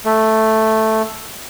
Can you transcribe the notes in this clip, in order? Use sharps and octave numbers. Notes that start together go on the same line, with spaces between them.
A3